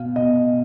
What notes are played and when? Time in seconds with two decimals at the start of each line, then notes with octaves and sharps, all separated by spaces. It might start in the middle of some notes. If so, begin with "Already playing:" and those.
Already playing: B2 F5
0.15 B2 D#5